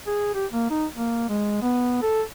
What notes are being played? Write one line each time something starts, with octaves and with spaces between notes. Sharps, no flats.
G#4
G4
A#3
D#4
A#3
G#3
B3
A4